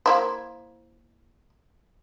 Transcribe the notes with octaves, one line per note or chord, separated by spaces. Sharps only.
A#3 E4 C5